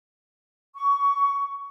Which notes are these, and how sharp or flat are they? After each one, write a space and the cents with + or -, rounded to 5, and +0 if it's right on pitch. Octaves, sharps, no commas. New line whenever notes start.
C#6 +15